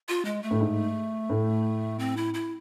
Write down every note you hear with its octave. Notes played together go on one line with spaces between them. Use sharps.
F4
G#3
A3
A2
G#2
A2
C4
E4
E4